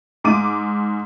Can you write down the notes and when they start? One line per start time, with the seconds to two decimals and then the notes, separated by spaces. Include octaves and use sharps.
0.24 G#2 D6 D#7